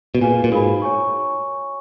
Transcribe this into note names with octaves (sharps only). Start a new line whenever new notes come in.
B2
A#2 G#4 B4 F5 G#5
A#2
G#2 F#4 A#4 F5 G#5 B5
C#5 G#5 C#6